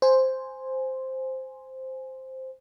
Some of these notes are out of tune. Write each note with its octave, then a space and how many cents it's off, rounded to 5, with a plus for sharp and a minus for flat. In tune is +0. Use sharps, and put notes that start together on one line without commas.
C5 +0 G#5 +0